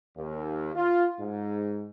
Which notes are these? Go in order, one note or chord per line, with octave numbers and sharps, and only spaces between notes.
D#2
F4
G#2